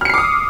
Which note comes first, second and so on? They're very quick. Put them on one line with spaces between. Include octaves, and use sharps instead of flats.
F6 C#7 C7 D6 D#6